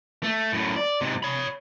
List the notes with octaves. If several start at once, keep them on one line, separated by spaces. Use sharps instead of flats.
A3
F#2 A2
D5
G#2 C3
C#5 B5